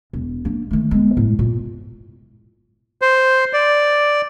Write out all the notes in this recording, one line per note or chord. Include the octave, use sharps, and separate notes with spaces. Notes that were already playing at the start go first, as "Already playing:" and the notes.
E1
A#3 D4
D#3 A3
G#3 B3
A2
A#2
C5
D5